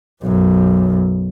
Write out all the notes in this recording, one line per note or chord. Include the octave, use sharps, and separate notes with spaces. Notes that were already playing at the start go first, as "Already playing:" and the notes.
B1 F#2